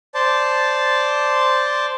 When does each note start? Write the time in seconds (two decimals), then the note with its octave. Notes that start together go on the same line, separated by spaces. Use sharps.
0.14 C5 D5 A5